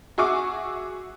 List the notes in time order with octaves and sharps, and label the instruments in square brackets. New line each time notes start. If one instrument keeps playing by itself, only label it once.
[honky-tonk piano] F#4 G#4 E5 C#6 D6 E6